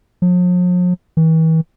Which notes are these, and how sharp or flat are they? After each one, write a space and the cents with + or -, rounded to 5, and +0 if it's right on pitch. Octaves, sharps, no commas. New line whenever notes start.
F3 +45
E3 -40